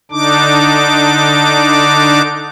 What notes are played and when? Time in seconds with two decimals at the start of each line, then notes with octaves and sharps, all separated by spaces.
0.11 D3 D4 D#4 D6